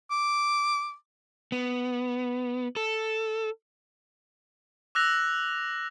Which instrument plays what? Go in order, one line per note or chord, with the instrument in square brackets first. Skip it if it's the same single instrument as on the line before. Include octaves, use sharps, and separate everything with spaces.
[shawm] D6
[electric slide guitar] B3
A4
[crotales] D6 E6 F#6 A#6 F7